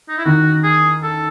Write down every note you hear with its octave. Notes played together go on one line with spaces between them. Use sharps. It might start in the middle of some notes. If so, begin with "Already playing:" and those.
D#4
E4
D#3 F#4
G#4
A4